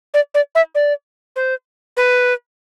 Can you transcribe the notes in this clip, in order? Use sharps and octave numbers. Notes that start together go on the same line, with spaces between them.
D5
D5
E5
D5
C5
B4